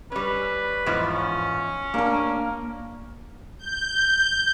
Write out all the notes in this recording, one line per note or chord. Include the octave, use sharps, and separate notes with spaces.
G3 C#4 B4
E2 G#2 F3
C#4
A#3 D4 A#4
G6